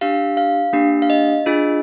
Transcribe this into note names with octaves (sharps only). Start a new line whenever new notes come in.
D4 G4 F5
F5
A#3 D4 G4
F5
D#5
D4 F4 G#4